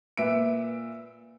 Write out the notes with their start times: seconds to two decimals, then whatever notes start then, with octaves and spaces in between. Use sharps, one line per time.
0.17 A#2 B4 E5 D7